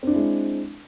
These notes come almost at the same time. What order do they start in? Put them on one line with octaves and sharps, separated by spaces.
C4 D4 E4 G#3